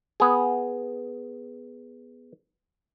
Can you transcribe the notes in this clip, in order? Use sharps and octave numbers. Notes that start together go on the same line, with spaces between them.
B3 G#4